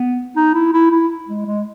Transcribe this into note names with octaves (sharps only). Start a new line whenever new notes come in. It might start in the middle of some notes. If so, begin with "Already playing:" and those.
Already playing: B3
D#4
E4
E4
E4
G#3
G#3